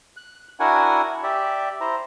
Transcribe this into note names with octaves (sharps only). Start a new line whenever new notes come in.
F#6
D4 E4 F#4 A#4 F#5 G#5
G4 D5 E5
E4 C5 A#5